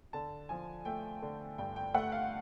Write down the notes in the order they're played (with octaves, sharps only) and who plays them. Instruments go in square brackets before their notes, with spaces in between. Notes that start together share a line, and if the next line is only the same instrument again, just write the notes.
[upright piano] D3 A5
F3 G#5
A3 G5
D3
G2 G5
G5
A3 F#5
F5